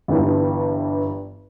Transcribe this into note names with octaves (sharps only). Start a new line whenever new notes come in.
G1 G2 E3